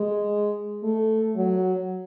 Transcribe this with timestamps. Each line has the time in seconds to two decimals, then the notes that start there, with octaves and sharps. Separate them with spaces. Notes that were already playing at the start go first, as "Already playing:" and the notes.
Already playing: G#3
0.83 A3
1.36 F#3